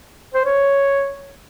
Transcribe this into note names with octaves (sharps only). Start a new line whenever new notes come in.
C5
C#5